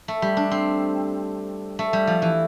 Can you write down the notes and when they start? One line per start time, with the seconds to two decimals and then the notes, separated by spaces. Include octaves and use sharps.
0.08 A3
0.22 G3
0.37 D4
0.51 C4
1.79 A3
1.93 G3
2.07 F3
2.22 E3